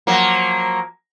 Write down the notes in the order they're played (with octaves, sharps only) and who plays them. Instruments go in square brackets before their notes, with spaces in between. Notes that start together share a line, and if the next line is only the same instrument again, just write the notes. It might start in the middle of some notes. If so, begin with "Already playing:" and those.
[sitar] F3 F#3 A#3